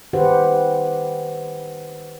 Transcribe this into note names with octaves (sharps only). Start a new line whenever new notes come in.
D#3 G4 B4 C5 F#5